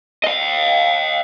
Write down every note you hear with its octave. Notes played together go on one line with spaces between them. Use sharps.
D#5 F5